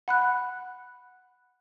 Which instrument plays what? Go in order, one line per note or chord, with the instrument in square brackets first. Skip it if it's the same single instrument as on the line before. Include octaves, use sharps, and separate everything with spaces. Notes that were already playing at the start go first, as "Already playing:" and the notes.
[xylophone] F#5 B5 F#6